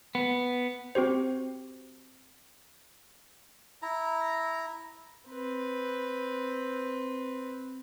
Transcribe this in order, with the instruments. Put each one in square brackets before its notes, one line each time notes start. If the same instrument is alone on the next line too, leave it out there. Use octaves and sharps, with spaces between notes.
[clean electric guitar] B3
[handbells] C4 F#4 G4 C5
[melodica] E4 A#5
[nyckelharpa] C4 B4